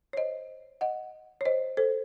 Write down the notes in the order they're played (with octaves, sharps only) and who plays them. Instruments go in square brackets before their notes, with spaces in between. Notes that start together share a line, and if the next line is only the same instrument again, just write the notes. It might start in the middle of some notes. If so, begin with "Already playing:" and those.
[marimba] C#5
C5 D#5
D#5 F#5
C#5
C5 D#5
A4 C5